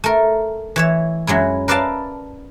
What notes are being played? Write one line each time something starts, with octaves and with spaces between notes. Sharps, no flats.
A3 A#4
E3 C#5 E5
F#2 F#3 G#3 E4
A#4 B4 D5 E5 F5 A5